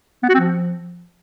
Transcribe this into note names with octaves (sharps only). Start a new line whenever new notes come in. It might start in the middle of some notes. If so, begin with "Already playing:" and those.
B3
F#4
C4
F3